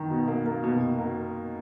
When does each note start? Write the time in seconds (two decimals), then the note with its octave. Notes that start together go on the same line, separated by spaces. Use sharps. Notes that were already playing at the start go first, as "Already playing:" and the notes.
Already playing: D#3
0.10 B2
0.28 A#3
0.46 A#3
0.63 B2
0.81 B2
0.98 A#3